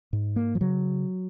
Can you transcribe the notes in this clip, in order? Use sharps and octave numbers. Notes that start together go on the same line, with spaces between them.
G#2
A#3
F3
C#3 F#3